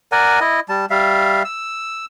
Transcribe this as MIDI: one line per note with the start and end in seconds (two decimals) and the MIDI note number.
0.12 0.39 70
0.12 0.39 74
0.12 0.39 78
0.12 0.39 80
0.41 0.60 64
0.41 0.60 75
0.69 0.86 55
0.69 0.86 81
0.90 1.43 55
0.90 1.43 76
0.90 1.43 77
1.45 2.06 88